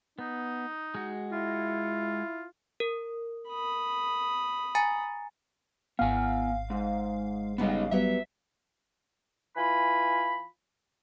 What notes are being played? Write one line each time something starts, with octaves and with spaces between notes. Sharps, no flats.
B3 D#4
G#3 F#4
E4 F4
A#4
B5 D#6
G#5 A#5 A6
G#1 B3 F5 G#5
G#2
C#3 G3 G#3 B3 D#4 D#5
F#3 G3 B3 E5
E3 F4 G#5 B5